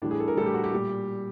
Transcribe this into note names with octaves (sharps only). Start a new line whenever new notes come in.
A2 E3 G3 D4
G#4
A4
A#4
A2 E3 G3 A4
G4
F#4
G4
A#2 G3